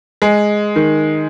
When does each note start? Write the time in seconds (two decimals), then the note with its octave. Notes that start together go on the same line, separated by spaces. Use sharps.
0.22 G#3
0.76 D#3